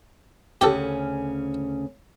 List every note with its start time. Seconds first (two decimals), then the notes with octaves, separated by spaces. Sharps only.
0.61 D2 C#3 C#4 G4 A4